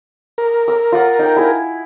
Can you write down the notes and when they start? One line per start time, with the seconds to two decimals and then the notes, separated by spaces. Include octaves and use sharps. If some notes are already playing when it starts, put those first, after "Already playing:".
0.38 A#4
0.68 E6
0.92 F4 F#5
1.19 D#4 G5
1.36 E4 G#4